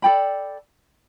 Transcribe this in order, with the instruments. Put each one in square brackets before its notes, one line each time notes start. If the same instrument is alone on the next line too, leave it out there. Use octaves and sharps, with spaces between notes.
[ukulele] A4 D5 G5 B5